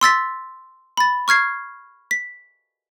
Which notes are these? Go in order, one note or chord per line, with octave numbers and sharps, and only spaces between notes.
C6 E6 A6 B6
B5 A6
C#6 F6 G#6 C7
B6